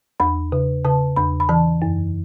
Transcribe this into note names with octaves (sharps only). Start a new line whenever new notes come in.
E2 B5
C#3
C#3 A5
E2 B5
B5
E3 A5
F#2